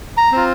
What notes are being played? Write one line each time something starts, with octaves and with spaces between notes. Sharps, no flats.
A#5
C4 F4